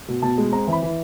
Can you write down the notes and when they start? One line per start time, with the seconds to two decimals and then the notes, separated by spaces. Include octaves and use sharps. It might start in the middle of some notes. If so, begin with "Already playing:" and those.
0.08 B2
0.22 B2 A5
0.38 G#3
0.52 C4 A#5
0.67 E3
0.73 B5
0.82 E3